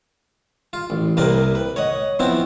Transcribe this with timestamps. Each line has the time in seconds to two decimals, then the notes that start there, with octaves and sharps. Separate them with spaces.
0.73 F4
0.90 A1
1.17 C2 C3 A#3 A#4 B4 D5
1.55 B4
1.76 C#5 D#5 F#5
2.19 F3 B3 C4 E4 F#4